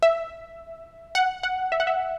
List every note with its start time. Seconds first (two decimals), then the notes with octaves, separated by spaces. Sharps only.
0.02 E5
1.15 F#5
1.43 F#5
1.72 E5
1.80 F#5
1.87 E5